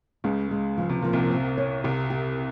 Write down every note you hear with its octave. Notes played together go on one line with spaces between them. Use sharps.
C#2 C#3 G#3
G#3
C#3 F3
C3
A#2 F3
C2 C3
C4
C#5
C2 C3 G4
G4